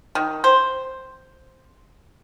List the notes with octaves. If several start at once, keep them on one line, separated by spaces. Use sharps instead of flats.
D#3
C5